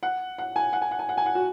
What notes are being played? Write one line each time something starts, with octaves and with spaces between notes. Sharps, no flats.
F#5
F#5
G#5
F#5
G#5
F#5
G#5
F#5
G#5
F#5
F#4